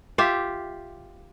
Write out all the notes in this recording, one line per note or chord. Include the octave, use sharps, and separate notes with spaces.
F4 G4 E5